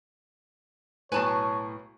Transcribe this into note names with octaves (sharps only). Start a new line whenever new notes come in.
B1 A2 B4 C#5 G#5 A5